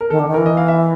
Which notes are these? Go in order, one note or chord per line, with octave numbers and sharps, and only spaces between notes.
A#4
D#3 A4
D3
D#3
E3 A#4
D#5
F5
E5